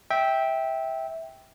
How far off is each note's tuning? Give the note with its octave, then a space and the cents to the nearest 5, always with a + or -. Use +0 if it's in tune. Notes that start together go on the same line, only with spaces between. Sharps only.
E5 -15 G5 +0